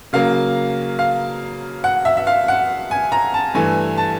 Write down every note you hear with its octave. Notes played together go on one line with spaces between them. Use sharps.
C#3 F#3 A#3 F5
F5
F#5
E5
E5
F5
F#5
G#5
A#5
A5
G2 E3 A3 G#5
A5